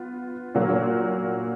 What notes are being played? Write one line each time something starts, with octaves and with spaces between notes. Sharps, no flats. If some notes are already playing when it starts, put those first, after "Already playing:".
Already playing: B3 F4
A#2 F#3 A#3